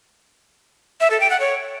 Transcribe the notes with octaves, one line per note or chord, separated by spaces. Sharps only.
E5
A4
G5
F#5
C#5